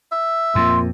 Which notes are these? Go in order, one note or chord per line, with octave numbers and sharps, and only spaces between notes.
E5
F2 A#2 C6